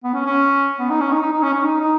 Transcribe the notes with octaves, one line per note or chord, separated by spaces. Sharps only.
B3
C#4
C#4
B3
D#4
C#4
D#4
D#4
D#4
C#4
C#4
D#4
D#4